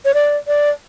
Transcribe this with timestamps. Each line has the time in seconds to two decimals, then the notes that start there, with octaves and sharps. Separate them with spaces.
0.05 C#5
0.14 D5
0.47 D5